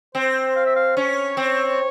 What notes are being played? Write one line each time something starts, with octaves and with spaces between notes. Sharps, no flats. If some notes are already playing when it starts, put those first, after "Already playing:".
C4 C5
F5
E5
F5
C#4 C#5
C4